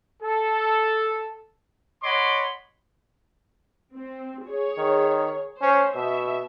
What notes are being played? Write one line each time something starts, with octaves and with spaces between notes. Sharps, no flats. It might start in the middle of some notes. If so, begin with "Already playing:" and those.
A4
C#5 D#5 F#5 B5 C6 D6
C4
G#4 C#5
D#3
C#4 C5
B2 E5